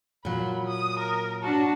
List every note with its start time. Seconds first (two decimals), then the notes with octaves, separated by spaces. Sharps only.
0.25 A#2 F#3 B5
0.66 D#6
0.99 A#4
1.43 D4 F#4 A5